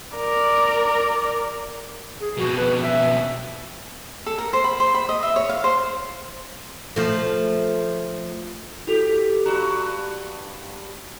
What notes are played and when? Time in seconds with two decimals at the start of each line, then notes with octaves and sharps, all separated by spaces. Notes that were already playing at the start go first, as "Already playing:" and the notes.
0.17 A#4 D5
2.21 G#4
2.37 F2 B2 F#4
2.57 B4
2.83 E5
4.26 A4
4.38 A#4
4.53 C5
4.64 B5
4.80 C5
4.94 B5
5.09 D#5
5.23 E5
5.36 C#5
5.49 F5
5.64 C5
6.96 F3 A3
8.87 E4 F#4 G4 A4
9.46 G2 F#4 A#5